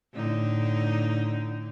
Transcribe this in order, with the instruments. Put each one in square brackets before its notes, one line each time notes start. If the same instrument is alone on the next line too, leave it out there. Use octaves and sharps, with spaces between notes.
[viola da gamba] A2 D3 D#4